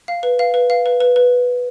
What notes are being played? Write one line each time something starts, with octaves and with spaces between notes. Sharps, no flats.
F5
B4
F5
B4
F5
B4
B4
B4